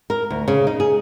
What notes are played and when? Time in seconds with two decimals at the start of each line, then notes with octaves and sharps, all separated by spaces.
0.10 A#4
0.30 D2
0.48 C#3
0.67 D#4
0.80 G#4